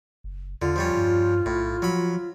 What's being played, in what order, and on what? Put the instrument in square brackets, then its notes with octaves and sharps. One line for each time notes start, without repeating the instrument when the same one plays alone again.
[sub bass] F#1
[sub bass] E2 [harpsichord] D3 [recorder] F4
[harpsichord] F3 G3 C#4
[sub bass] G2
[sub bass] B1 [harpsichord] A2
[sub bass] F3 [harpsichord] F#3 B5